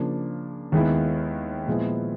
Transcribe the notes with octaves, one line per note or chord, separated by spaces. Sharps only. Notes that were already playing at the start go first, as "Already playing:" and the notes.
Already playing: C#3 F3 A#3 D4
D#2 D#3 G#3 B3 E4
A#2 F3 G#3 B3 E4